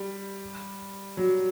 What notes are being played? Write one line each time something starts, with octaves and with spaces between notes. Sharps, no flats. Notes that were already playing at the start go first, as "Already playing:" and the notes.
Already playing: G3
F#3